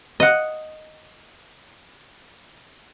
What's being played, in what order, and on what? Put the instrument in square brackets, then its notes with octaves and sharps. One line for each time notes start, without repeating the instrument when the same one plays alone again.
[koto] D#5 F#5